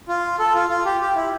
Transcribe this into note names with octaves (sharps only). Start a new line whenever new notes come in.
F4
A4
F4
F4
G4
G4
E4